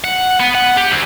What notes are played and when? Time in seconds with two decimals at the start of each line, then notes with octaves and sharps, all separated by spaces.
0.04 F#5
0.40 B3
0.55 F#5
0.77 G4
0.92 D2